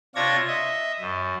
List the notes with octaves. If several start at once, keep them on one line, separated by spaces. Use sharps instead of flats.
C3 D4 F4 C#5 G#6 A#6
D#5 E5
F#2